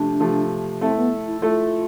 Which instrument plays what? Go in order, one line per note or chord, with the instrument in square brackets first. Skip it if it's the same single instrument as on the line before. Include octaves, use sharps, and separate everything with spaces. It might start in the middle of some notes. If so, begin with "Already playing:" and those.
Already playing: [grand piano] C3 F3 A3 [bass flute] D4
[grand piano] C3 F3 A3
[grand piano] A3 E4 A4 [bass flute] C4
[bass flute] B3
E4
[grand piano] A3 E4 A4 [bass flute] F4